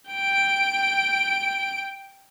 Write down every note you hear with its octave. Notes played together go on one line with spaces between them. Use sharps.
G5 D7